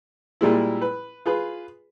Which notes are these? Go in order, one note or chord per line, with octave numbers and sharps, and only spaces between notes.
A#2 G3 G#3 E4
B4
F4 G#4 B4